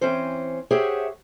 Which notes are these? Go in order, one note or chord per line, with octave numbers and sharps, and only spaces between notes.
E3 C4 C#4 C5
G4 G#4 C5 C#5 E5 F#5